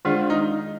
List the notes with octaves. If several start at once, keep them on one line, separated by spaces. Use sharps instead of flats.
D#3 G#3 D4 F4 G#4 D5
D#4